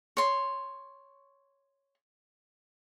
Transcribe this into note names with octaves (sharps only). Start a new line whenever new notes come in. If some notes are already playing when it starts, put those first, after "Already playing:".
C#5 C6